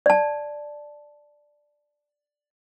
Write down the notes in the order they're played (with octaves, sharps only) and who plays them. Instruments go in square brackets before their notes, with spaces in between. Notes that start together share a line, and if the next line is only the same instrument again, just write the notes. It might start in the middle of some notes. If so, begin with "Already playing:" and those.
[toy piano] D5 A5